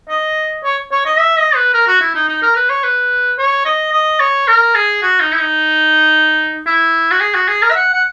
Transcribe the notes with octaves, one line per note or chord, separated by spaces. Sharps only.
D#5
C#5
C#5
D#5
E5
D#5
B4
A#4
F#4
E4
D#4
D#4
A#4
B4
C#5
B4
C#5
D#5
D#5
C#5
A#4
G#4
F#4
D#4
E4
D#4
E4
F#4
G#4
F#4
G#4
A#4
E5
F#5
F#5